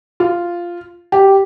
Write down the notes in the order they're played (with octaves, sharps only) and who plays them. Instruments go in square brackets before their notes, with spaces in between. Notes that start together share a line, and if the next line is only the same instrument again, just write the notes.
[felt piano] F4
G4